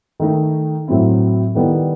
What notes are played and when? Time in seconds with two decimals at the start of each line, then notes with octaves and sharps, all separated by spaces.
0.20 D#3 A3 D#4
0.88 A2 F#3 C4 E4
1.55 D#3 G3 B3 E4 A4